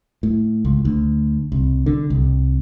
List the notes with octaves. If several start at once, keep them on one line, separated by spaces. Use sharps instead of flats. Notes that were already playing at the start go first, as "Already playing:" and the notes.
A2
C#2
D2
C2
D3
C2